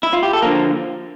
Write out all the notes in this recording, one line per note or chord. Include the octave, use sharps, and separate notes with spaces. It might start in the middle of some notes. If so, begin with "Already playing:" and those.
E4
F4
G4
A4
D3 F3 A#3 A#4